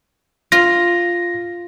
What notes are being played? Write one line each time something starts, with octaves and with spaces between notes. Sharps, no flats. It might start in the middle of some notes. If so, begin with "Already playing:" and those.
F4 A#6